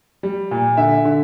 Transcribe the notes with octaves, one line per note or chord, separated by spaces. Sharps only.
G3
A#2
D3 E5
D3